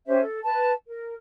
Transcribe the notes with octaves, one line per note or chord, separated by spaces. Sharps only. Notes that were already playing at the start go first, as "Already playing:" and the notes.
C#4 G4 C5 E5
A4
B4 A5
A#4